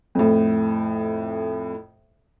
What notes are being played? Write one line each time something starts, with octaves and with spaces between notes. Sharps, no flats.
F2 A2